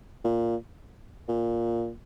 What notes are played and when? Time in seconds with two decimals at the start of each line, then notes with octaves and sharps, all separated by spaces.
0.24 A#2
1.28 A#2